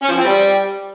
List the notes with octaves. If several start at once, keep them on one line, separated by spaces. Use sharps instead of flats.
C#4
F3
C4
G3